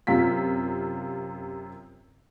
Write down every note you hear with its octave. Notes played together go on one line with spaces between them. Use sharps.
F#2 C3 F4 B6